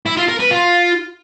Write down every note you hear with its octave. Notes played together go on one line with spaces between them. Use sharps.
E4
F4
A#4
B4
F4